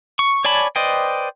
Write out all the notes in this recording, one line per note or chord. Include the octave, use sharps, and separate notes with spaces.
C#6
C#5 D5 G#5 A5 B5
B4 C5 D5 D#5 G5